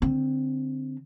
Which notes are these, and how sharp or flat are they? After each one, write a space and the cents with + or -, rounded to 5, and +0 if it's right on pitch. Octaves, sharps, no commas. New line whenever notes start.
D3 -5 C4 +0